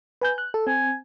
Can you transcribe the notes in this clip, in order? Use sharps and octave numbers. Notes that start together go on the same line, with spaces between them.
B4 G#5 G6
F#6
A4
C4 G#5